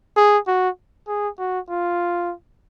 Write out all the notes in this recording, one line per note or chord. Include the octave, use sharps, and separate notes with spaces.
G#4
F#4
G#4
F#4
F4